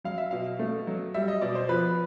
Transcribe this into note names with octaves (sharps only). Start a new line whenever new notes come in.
F#3 F5
E5
B2 F5
A3
F#3
G3 E5
D#5
B2 D5
C5
F3 B4